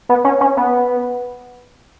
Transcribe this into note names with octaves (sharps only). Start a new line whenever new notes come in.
B3
C#4
C#4
B3